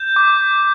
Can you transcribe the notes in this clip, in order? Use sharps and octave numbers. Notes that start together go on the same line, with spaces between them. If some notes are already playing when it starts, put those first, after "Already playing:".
Already playing: G6
D6